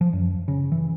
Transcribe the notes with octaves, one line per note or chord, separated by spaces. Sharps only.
F3
F#2
C#3
E3